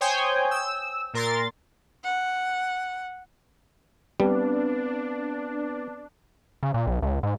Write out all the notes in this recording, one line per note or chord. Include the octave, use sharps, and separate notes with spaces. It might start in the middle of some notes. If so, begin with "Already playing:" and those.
C5 C#5 G5 G#5 D#6 G6
E6
A#2 A#4 C6 A6
F#5
G3 B3 C4 D4 B4
C#3
A#2
B1
C#2
G#2